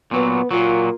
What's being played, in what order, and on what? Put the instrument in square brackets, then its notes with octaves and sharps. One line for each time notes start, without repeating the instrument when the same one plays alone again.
[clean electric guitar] A#2 F#3 [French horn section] B3
[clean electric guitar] A#2 F#3 [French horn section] A#3 F4